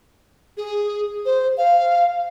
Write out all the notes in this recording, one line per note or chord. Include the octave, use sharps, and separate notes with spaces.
G#4
C5
F5